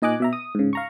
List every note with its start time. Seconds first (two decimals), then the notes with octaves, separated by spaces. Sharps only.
0.02 A#2 D#4 D#5 G#5 D6 F#6
0.20 B2 E5 A#5
0.33 D#6
0.55 G#2 C#3
0.73 F5 A#5 C#6